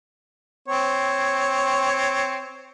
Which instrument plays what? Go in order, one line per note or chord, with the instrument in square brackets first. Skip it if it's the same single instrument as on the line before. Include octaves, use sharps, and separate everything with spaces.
[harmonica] C4 C#5